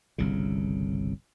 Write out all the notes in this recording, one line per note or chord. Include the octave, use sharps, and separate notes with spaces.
G1 C2 C#3